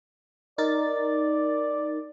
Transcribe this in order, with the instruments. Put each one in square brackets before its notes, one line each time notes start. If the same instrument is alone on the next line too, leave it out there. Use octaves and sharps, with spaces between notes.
[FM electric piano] D#4 A#4 A6 [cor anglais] D5